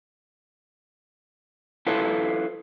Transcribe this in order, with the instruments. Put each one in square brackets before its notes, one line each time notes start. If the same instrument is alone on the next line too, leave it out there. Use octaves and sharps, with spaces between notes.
[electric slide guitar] E4 F4 A4 B4 C#5 A5